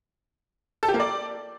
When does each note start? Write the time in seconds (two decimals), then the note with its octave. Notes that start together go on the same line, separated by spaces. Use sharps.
0.83 A4
0.88 G4
0.94 A#3
1.00 D5